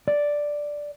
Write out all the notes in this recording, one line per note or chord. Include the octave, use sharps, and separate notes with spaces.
D5